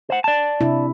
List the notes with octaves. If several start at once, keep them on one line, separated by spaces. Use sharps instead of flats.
C5 F#5
D5 A5
C3 D4 E4